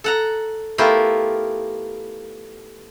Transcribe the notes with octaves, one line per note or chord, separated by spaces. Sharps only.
A4 F#5 A#5
A3 B3 E4 F4 G4 A#4